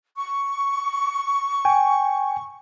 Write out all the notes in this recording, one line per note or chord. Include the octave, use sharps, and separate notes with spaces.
C#6
G5 G#5